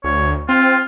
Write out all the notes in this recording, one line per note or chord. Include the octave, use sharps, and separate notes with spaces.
D2 C#5
C4 F4